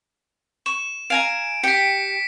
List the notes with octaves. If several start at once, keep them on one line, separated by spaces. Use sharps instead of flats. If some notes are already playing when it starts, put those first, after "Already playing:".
C#6 E7
F5 G#5 A#5 D7
G4 G5 B6 C#7